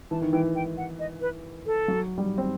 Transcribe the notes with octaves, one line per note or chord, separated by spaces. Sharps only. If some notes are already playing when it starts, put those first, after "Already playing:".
E3 A5
D#3
E3 G5
G5
F#5
D#5
B4
A4
F#3
G3
C4